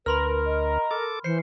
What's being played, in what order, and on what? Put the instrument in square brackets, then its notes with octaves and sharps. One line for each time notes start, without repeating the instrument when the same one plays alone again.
[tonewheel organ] D2 [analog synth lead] A#4 [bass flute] B4 [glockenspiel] B5 C6 F6
[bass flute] D#5
[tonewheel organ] A4 D6
[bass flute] E3 [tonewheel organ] C5 [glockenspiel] C7 C#7